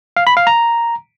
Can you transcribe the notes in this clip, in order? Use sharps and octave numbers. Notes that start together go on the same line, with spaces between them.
F5
B5
F5
A#5